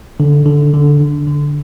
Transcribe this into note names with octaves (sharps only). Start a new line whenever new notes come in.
D3
D3
D3
D3
D3